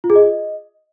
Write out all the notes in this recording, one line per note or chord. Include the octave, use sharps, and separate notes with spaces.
F4
G#4
D#5